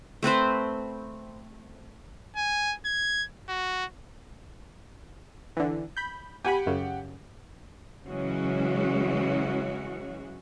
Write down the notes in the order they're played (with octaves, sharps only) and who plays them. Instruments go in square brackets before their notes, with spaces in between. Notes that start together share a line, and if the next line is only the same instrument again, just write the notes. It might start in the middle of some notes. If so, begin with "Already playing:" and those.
[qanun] A3 C4 B4 C5
[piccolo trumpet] G#5
G#6
F#4
[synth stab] D3 E3
B5 G6
[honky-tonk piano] G4 F#5 [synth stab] G#5 B5
[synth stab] F#2 C#3
[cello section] C#3 E3 F#3 G#3 C#4 F#4